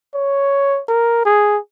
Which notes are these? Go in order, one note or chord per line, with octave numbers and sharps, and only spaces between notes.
C#5
A#4
G#4